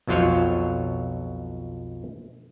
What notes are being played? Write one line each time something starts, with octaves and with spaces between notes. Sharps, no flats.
B1 F2 F#3 F4 C5 C#5